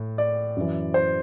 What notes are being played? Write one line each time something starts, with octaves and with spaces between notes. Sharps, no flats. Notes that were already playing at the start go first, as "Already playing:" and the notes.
Already playing: A2
D5
F#2 E3
C5